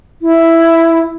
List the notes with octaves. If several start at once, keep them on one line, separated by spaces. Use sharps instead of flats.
E4